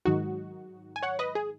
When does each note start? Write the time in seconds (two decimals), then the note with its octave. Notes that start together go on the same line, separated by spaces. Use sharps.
0.05 G#2 D#3 F#3 D#4 F#4
0.96 G#5
1.03 C#5 F#5
1.19 B4 D#5
1.35 G#4